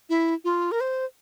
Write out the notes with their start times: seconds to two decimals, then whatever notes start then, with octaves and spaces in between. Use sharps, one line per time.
0.09 E4
0.44 F4
0.72 A#4
0.81 C5